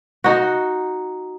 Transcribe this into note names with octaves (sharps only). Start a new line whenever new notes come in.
D#4 F#4